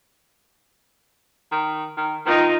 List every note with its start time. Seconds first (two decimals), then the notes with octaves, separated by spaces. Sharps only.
1.52 D#3
1.97 D#3
2.26 D#3 D#4 F4